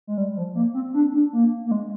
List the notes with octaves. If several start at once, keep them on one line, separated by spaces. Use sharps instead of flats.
G#3
G3
F3
A#3
C4
D4
D4
A#3
A#3
G#3